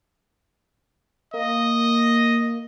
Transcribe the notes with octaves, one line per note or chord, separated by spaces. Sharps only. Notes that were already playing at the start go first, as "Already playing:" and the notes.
A#3 D#5